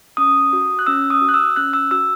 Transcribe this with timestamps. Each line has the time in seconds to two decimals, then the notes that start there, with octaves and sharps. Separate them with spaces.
0.17 C#4 D#6
0.53 F#4
0.79 F#6
0.87 C#4 E6
1.10 D#6
1.22 F#4
1.29 F#6
1.34 E6
1.56 C#4 F#6
1.73 E6
1.91 F#4 E6